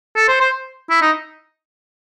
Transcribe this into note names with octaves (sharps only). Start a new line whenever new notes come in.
A4
C5
C5
E4
D#4